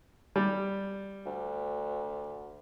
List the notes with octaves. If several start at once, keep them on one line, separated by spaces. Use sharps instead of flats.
G3
D2